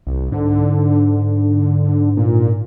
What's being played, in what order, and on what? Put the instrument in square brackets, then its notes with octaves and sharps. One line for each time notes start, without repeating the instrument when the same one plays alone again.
[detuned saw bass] C2
[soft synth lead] G#2 [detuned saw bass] D3
[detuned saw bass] A#2